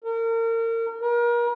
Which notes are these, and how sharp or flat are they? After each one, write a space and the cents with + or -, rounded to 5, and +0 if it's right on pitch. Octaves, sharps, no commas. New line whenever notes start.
A#4 -35
A#4 +35